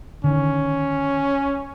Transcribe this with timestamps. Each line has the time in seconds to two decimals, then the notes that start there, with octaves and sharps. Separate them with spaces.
0.24 D3 D#3 C#4